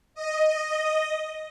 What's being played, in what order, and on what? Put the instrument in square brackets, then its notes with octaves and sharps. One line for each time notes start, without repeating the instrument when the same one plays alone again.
[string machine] D#5